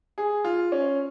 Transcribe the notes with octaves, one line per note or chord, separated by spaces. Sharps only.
G#4
F4
C#4